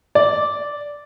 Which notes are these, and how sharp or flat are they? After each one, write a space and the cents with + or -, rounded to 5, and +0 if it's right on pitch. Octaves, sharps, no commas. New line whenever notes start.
D5 -10